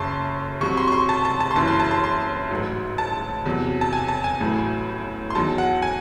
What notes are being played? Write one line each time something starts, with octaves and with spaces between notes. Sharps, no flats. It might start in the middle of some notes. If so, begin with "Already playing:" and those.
Already playing: F#1 F#2 C#3 A5 C6 C#6
C2 C3 F#3 C#6
C6
C#6
C6
A5
A5
A5
C6
F#1 F#2 E3 A5
C6
A5
C6
C6
A1 G#2 F#3
A5
E2 C3 F#3
A5
G#5
A5
G#5
A1 A2 F#3
C6
E2 D#3 F#3 A5
F#5
G#5